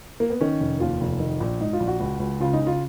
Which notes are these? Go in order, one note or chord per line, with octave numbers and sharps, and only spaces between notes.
A#3
B3
D#3 C#4
F1
D#2 F4
F1
D#3
A#1
G#2 D#4
F4
A#1
F#4
C#2
C#2
C#3 F4
D#4
C#3
F4